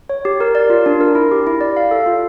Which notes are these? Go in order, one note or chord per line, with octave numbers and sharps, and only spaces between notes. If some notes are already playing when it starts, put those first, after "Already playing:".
C#5
G4
A#4
D5
F4
D4
A#4
E4
G4
E4
D5
F5
A4
F4